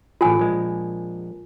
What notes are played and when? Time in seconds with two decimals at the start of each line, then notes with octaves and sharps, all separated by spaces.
0.21 A1 F4 G#4 G#5
0.39 A#1 G#3